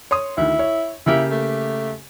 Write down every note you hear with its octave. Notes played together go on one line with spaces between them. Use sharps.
C#5 C6 D#6
D2 D#3 E4
C#5
C#3 A#3 E4 G4
A3